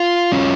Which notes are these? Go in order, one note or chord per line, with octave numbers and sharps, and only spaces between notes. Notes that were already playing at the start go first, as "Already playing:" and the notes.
Already playing: F4 F5
F#3 C#4